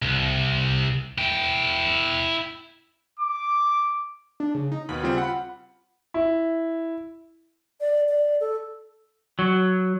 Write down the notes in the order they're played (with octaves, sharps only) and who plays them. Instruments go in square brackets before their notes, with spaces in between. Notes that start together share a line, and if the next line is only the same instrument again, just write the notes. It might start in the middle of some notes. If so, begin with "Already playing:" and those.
[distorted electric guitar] C2
E4 G5
[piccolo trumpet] D6
[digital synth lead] D4
C#3
D#4
[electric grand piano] D#2 B2 [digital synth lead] B5
[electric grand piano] C#3 G3 C4 [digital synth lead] F4
[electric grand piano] F#5 B5
[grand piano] E4
[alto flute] D5
D5
A4
[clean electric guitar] F#3